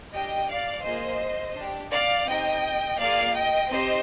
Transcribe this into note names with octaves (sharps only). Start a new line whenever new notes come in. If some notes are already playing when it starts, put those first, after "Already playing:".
D4 G4 D#5 G5
D5 F5
A#3 F4 G#4 C5 D#5
D4 G4
D5 F5
C4 D#4 G4 D#5 G5
A#3 F4 G#4 D5 F5
D#5 G5
C4 D#4 G4 C5 D#5